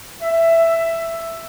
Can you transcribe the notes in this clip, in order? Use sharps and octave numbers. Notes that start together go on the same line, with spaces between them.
E5